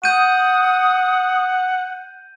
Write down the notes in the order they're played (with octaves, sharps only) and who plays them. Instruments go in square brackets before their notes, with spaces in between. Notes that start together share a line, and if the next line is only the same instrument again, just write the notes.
[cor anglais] F#5 [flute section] D#6 [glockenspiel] G6 D#7